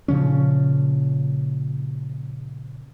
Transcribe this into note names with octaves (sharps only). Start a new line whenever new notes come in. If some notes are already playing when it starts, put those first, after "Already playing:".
A#2 C#3 F3 C#4